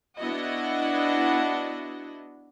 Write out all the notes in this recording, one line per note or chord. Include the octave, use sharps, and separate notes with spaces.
B3 D4 E4 F#4 D#5